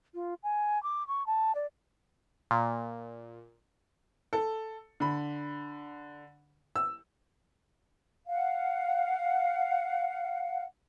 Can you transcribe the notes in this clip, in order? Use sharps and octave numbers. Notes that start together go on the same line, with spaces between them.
F4
G#5
D6
C#6
A5
D5
A#2
A4
D3 B5
E6
F5 F#5